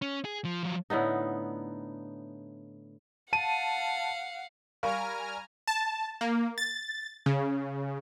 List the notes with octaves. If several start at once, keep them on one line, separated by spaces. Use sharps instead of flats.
C#4
G#4
F3
F3 F#3
A2 D3 B3 D#4
F5 F#5 A5 D#7
G3 A#4 F5 G#5 A#5 C#6 F6
A5
A#3
A6
C#3